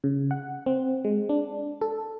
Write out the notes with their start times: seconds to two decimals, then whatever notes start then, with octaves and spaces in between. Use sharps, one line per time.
0.04 C#3
0.31 F#5
0.66 C4
1.05 G#3
1.29 D4
1.81 A4